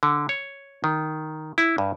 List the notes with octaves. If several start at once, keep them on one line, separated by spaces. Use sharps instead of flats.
D3
C#5
D#3
E4
G2